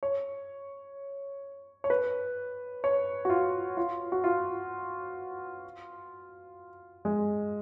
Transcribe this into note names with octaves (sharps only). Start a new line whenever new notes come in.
C#5
C#5
B4
C#5
F#4
F4
F4
F#4
F4
G#3